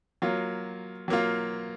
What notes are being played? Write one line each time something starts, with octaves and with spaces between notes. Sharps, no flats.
F#3 A#3 F4
F#3 A#3 F4